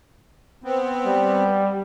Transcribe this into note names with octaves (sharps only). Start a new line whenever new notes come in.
B3 C4
G3